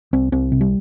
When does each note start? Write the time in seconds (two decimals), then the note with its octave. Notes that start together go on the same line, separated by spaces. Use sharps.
0.13 C2 C4
0.32 C2 C4
0.52 C3
0.61 G3